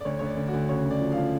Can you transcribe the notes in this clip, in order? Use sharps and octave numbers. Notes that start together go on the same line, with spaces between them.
D5
D2 C#5
D2 C#5
D5
D2
D2 F#4
C#3 C#5
D2
D5
F3
F5
F3